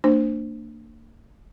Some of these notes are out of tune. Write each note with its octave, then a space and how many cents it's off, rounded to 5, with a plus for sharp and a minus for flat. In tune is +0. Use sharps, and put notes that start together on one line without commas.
A#3 -35 D4 +15 C5 +0